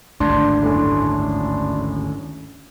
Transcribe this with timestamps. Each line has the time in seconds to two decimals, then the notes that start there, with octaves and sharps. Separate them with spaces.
0.20 G#1 D2 G2 D4 C6
0.62 F#2 A2